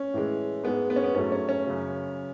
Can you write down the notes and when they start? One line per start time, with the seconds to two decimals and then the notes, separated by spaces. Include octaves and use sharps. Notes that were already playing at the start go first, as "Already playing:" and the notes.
Already playing: C#4
0.14 A2 E3 G#3
0.64 G#2 G#3 B3
0.90 B3
0.96 C#4
1.04 B3
1.15 G#2 F#3 A3 C#4
1.32 C#4
1.49 C#4
1.66 F#2 C#3 F#3